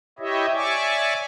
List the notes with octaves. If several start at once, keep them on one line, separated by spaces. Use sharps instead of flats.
E4 G4 C#5 D#5 E5
C#5 D5 E5 G#5 C#6 D6